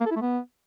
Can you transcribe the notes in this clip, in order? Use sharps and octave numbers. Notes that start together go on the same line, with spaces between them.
A#3
A4
E4
A3
B3